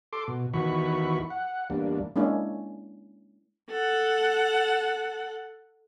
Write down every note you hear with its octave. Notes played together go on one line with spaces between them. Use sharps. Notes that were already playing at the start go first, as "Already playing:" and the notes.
A4 C6 D6
B2
E2 D#3 E3 F#4 B5 C#6
F#5
E2 G3 A#3 D4
G#3 A#3 C#4 D4 E4
A4 F#5